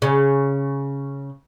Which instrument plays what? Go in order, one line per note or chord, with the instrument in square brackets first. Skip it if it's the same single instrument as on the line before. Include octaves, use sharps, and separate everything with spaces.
[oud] C#3